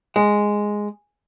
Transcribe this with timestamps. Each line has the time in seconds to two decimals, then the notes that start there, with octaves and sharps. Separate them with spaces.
0.16 G#3